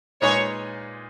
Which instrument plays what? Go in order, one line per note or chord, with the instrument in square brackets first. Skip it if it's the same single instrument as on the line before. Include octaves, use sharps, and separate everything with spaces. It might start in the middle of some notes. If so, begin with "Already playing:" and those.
[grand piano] A#2 G#3 D#4 G#4 B4 [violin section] C#5